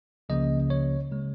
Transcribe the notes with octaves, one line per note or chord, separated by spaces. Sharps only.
C#2 C#3 F3 A#3 D#5
C#5
C#3 G#3